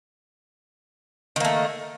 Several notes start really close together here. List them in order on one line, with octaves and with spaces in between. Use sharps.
D#3 A#3 A3